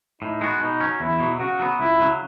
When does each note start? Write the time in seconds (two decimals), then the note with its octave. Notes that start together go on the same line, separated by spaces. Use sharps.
0.22 A2 D#4
0.41 G#3 B3 F#4
0.61 B2 D#4
0.81 F#3 C#4
1.00 E2 E4
1.20 B2 F#3
1.40 C#3 F#4
1.60 F#3 B3
1.80 C#2 E4
2.00 C#3 F#3